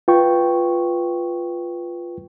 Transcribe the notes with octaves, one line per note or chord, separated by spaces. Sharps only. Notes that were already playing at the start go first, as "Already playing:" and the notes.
F4 B4 G5 C#6